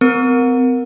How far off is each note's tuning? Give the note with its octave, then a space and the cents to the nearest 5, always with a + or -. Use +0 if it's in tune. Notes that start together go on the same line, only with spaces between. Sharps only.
C4 -40 A#4 +5